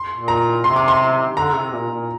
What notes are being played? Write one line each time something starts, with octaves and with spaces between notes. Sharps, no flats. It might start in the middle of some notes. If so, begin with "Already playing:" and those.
Already playing: C6
A#2
A#5
C3 C6
D6
C6
D3 A#5
C3
A#2
A#2